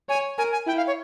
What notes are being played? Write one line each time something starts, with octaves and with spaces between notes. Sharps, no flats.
C#5 G#5
A#4 G#5
G#5
E4 G5
F5
C#5